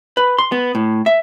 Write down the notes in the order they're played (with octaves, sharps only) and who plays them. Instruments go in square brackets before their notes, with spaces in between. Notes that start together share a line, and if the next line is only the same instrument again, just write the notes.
[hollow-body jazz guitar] B4
C6
B3
A2
E5